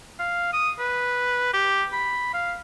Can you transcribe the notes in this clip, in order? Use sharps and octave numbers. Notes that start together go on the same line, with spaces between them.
F5
D#6
B4
G4
B5
F5